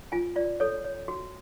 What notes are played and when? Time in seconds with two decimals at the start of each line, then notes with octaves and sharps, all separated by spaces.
0.12 F4 G#5
0.36 F4 D5
0.60 A4 C#5
0.84 C#5
1.08 F#4